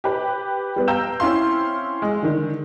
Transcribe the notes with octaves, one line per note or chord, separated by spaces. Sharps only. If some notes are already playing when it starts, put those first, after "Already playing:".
G4 B4
G3 B3
F5 G5 A#5 E6 G6 E7
C4 C#4 E4 F5 C6
G#3
D3 D#3